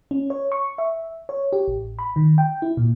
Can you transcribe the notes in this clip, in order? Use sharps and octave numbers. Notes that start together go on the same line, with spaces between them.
C#4
C#5
C#6
E5
C#5
G4
A1
B5
D#3
G5
E4
A#2